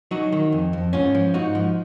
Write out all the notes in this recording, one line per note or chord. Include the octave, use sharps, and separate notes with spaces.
F#3 D#4 F#4
D#3
F2
F2
G#2 C#4 F4
F3
G#2 D#4 F#4
F3